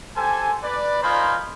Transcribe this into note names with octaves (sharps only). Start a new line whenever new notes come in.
G4 A4 C5 G#5
B4 D5
D#4 F4 A#4 C5 G#5 B5